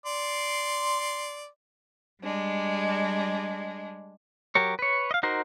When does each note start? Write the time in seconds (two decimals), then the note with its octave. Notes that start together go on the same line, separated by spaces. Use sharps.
0.06 D5 C6
2.21 G3 G#3 D4
4.55 F#3 G4 A#4 C#5
4.79 B4 C#5
5.11 D#5 F5
5.23 D#4 F#4 A#4 C5